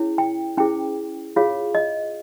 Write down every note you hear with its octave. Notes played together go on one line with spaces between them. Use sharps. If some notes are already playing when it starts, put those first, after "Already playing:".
Already playing: C#4 E4 G#4 C#5
G5
C#4 E4 G#4 C5 G5
F4 G#4 C#5 F5
D#5